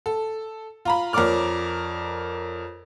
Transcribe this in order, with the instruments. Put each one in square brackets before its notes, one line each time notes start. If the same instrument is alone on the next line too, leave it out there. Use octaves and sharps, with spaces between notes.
[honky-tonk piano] A4
F4 A#5 B5
F2 A#4 C#5 D5 D6 F6